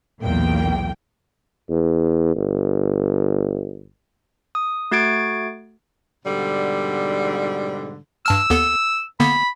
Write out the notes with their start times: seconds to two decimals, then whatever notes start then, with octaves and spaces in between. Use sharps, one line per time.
0.22 B1 E2 A#2 A#3 G5
1.69 E2
2.36 G1
4.55 D#6
4.91 A3 F#4 G#6 A6 D7
6.24 G#2 B2 D3 G3
8.26 G2 A5 E6 F6
8.50 D#2 B3 A4
9.20 D3 A#3 B3 B5